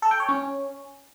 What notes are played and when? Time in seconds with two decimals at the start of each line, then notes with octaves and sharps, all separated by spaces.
0.02 A4
0.11 G5
0.20 C#5
0.29 C#4